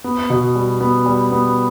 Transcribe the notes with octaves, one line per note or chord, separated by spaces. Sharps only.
B3
B2
G3
B3
G3
B3